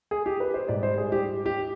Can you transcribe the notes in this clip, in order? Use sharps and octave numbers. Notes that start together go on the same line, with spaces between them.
G#4
G4
B4
C5
G#2 G3 D5
C5
G#4
G4
G4